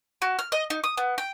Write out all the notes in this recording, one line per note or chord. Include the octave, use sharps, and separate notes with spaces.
F#4
F6
D#5
D#4
D#6
B3
G5